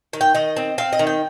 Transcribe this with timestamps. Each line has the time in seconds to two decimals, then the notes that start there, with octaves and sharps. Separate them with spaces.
0.13 D#3
0.21 G5
0.34 D#3 D#5
0.57 C4
0.78 C4 F5
0.93 D#5
0.99 D#3
1.07 G5